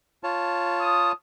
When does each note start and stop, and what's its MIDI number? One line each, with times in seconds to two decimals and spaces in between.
0.23 1.12 65
0.23 1.12 73
0.23 1.12 81
0.80 1.11 87